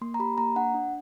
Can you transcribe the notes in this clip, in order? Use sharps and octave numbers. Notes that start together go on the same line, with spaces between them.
A#3 C6
A#5
G4 B5
A#3 A#5
D4 F#5
D4